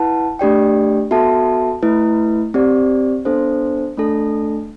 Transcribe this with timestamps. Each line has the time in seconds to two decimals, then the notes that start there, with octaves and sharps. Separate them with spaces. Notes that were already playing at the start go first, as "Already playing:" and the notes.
Already playing: E4 B4 F#5 A5
0.39 A3 D4 G4 D5 G5
1.11 B3 F#4 A4 E5 A5
1.83 A3 E4 B4
2.54 C4 G4 D5
3.25 B3 D4 A4 C5
3.97 A3 D4 A4